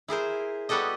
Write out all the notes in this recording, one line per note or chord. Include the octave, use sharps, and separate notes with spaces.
E4 G#4 A#4 C5
G3 B3 F#4 G4 A4 D#5